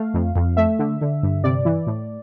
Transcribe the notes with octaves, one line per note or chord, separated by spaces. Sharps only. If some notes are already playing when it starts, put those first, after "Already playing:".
Already playing: A3 F5
F2
F2
A3 E5
D3
D3
G2
C3 D5
E3
A2